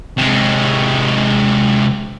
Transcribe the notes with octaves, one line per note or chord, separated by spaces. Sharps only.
C3 G#3